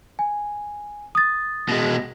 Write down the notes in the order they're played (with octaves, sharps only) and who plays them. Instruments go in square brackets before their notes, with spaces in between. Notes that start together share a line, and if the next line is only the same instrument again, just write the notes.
[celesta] G#5
D#6 A6
[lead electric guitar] B2 G#3